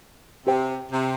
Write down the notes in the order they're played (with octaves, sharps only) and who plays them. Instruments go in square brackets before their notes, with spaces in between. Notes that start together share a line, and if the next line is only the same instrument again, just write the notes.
[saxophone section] C3 [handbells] G4 C5 G5
[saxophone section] C3